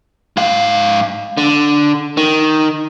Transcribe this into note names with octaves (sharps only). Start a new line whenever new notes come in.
G#2 F5
D3
D#3